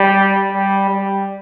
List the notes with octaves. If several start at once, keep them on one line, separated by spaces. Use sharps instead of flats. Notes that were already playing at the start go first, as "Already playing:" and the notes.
Already playing: G3
G3
G3